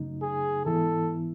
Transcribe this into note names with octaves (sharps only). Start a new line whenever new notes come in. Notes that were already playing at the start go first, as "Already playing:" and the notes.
Already playing: F#2 C#3 F#3 A3 D#4
G#4
G#2 E3 B3 E4 A4